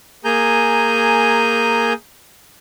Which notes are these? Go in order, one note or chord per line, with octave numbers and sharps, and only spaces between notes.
A#3 G#4 G#5 A#5 G6